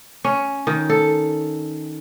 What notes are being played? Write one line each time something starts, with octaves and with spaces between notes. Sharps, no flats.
C#4
D#3
A4